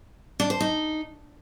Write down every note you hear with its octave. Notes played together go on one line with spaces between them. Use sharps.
D4
C5
D#4